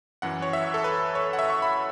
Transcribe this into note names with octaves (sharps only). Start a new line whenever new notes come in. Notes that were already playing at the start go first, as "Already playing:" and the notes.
F#2 E3 F#5
C#5
E5
A4
B4
C#5
F#5
E5
C#6
B5